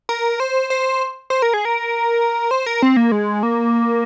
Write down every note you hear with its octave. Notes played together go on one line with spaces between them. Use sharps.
A#4
C5
C5
C5
A#4
G#4
A#4
C5
A#4
C4
A#3
G#3
A#3